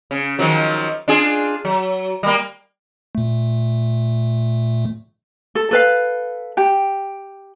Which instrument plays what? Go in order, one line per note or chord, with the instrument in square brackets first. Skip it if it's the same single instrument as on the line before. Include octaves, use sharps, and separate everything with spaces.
[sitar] C#3
D#3 F3 F#3
D4 F4 G#4
F#3
G3 A#3
[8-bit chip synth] A#2 A3
[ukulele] A4
A4 B4 F5
G4 G5